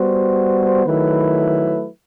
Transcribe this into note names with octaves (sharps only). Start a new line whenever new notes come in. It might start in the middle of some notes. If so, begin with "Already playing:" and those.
Already playing: G3 B3 F#4 C5
D#3 F#3 A3 E4 B4